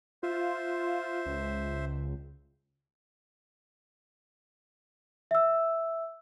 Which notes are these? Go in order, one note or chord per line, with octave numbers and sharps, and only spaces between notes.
F4 C5 E5
C#2
E5 E6